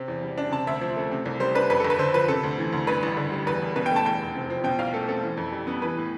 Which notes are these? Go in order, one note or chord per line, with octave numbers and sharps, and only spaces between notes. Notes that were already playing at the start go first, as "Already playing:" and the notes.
Already playing: C3 C4
E2
G3
D4
C3 A5
D2 E5
F3
A3
C3
C2
G3 C5
D4 B4
F2 B4
A4
G1
B4
D3 C5
F3 B4
C3 A4
D2
E3
D2
G2 B4
A1
D3
G3
E2 B4
E1
B2 B4
G5
A3 A5
E2 G5
F1
C3
F3
B2 G5
C2 F5
A3 A4
C4 A4
E3
F2
G3
B3
E3 B4
A2